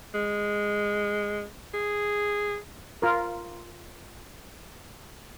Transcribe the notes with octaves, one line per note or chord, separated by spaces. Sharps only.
G#3
G#4
F4 A#4